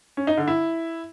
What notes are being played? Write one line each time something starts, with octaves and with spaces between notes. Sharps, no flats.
C#4
D#4
D3
E4